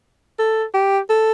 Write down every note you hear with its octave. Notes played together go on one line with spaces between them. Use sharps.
A4
G4
A4